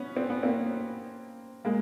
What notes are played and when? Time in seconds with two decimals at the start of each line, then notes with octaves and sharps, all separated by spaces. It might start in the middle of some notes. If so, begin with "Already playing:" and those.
Already playing: B3 C#4
0.16 C4
0.30 B3
0.43 A#3 C4
1.65 G#3 A#3